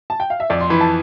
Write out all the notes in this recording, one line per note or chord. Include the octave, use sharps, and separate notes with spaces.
A5
G5
F5
E5
F2 D5
C6
E3 B5
A5